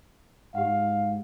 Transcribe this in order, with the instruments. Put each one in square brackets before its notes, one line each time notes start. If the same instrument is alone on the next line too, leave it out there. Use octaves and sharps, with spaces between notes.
[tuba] G#2 [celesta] G4 F#5 [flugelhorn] F5